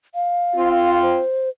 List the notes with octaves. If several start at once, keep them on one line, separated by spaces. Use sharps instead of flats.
F5
C4 F4
C5